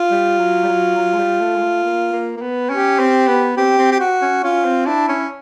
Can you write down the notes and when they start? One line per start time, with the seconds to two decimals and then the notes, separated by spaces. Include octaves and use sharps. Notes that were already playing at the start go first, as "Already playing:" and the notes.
Already playing: F4
0.11 G3
0.39 F#3
0.63 G3
0.68 F#3
0.97 F#3
1.14 G#3
1.18 G3
1.40 A3
1.56 G#3
1.62 A3
1.84 A#3
2.13 A#3
2.37 A#3
2.41 B3
2.70 C#4 G4
2.99 C4
3.27 B3
3.57 C4 G4
3.78 C4
3.91 G4
4.00 F#4
4.21 C#4
4.43 C#4 F4
4.65 C4
4.86 D4 E4
5.08 C#4